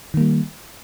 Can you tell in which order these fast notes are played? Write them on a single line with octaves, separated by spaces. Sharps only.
D#3 A#3 G3